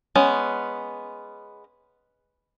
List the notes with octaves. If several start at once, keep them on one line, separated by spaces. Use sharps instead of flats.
G#3 B3 C#4